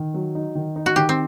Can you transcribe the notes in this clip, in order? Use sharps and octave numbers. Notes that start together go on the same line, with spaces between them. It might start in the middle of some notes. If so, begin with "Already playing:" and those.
Already playing: D#3
F#3
D#4
D#3
D#4
F#4
D#3 G4
C4